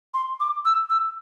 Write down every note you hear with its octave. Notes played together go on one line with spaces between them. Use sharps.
C6
D6
E6
E6